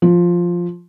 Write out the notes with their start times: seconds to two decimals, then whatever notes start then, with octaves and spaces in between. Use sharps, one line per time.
0.02 F3